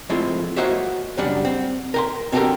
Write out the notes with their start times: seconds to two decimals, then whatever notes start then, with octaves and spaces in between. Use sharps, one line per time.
0.09 F3 G#3 A3 C4 E4 F4
0.56 A#3 F#4 C5 C#5 D#5 E5
1.17 F#2 C#3 G3 D4 F#5
1.45 C4
1.94 A#4 G5 C6
2.32 C4 D4 F#4 G4 A4 A#4